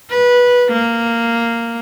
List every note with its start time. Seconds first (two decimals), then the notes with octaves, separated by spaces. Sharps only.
0.10 B4
0.72 A#3